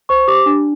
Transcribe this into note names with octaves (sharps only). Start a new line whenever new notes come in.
C5 C#6
G4 D6
D4